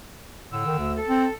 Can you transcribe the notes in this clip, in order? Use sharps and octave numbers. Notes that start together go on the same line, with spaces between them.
A2 D3 E6
D#3
D2
A4
C4